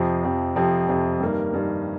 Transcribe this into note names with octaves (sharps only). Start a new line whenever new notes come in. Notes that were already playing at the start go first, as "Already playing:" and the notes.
Already playing: F2 C3 F3 C4
F2 C3 F3 C4
F2 C3 F3 C4
F2 C3 F3 C4
G2 D#3 A#3
G2 D#3 A#3